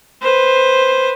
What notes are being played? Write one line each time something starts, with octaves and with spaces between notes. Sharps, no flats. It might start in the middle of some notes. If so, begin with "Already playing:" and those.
B4 C5